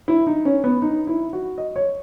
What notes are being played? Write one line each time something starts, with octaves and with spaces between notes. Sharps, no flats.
E4
D#4
C#4
B3
D#4
E4
F#4
D#5
C#5